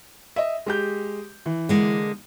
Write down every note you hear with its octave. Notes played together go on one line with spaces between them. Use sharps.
D#5 E5
G#3 G4 G6
E3
D3 G#3 A#3